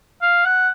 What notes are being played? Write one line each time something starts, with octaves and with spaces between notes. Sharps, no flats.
F5
F#5